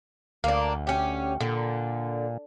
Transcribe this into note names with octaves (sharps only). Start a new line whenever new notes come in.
D2 A#3 D4
C#4 G4
A#2 D3